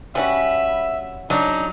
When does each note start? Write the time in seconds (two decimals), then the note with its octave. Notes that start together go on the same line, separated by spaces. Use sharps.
0.15 G3 C#4 F#4 B4 E5
1.30 C#3 F#3 D4 D#4